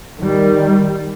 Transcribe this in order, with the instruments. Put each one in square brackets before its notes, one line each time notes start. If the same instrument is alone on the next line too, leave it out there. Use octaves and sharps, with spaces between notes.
[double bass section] D#3 G3